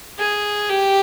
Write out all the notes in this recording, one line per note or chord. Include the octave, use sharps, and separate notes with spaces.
G#4
G4